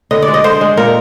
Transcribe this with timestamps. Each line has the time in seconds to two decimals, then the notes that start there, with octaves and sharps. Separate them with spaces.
0.11 D3 D#5
0.22 D5
0.28 G#3
0.34 D#5
0.44 D3 C5
0.61 G#3
0.77 A#2 A#4